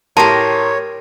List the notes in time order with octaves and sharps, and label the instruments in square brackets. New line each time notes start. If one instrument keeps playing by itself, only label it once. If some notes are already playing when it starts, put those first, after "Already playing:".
[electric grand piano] A2 A#5 C6 [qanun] G4 A#4 [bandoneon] C#5 [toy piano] A5